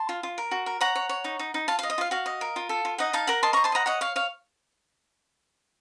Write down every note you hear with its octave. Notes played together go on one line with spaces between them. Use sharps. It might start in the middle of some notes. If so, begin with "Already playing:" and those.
Already playing: A5 C6
F4
F4
A#4
F#4
A#4
C#5 F#5 A#5
C#5
C#5
D#4
D#4
D#4
F4 F5 A5
D#5 F5
D#5
F4 F5
F#4 F5
D#5
A#4
F4
A4
F4
D#4 D#5 F#5
D#4 F5 A5
A#4 F#5 A#5
D#5 A5 C6
C5 A#5 C#6
A5 C6
D#5 F#5 A#5
C#5 D#5 F#5
C#5 F5
C#5 F5